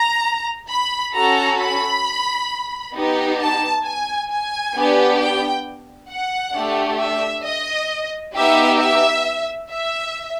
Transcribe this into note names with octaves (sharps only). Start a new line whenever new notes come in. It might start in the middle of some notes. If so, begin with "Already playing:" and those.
Already playing: A#5
B5
C#4 F#4 A4 A#5
B5
B3 D#4 G4
A5
G#5
G#5
B3 D4 G4
G5
F#5
A3 D4 G4
E5
D#5
B3 D#4 G4 E5
E5
E5